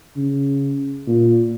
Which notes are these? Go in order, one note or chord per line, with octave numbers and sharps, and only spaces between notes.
C#3
A#2